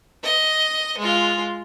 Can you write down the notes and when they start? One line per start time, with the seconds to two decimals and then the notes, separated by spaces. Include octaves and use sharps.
0.24 D#5
0.98 G#3 F4